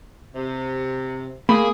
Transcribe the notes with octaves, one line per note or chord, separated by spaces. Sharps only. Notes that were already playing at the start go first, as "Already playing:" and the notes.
C3
A3 A#3 G#4 B5